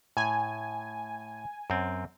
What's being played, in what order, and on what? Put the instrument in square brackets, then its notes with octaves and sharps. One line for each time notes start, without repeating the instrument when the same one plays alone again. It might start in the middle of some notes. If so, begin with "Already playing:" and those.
[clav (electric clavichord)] A2 [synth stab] G#5
[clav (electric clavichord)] F#2 C4